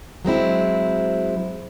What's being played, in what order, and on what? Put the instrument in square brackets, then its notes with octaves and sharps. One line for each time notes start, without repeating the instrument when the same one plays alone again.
[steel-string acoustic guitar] F#3 G#3 C4 E4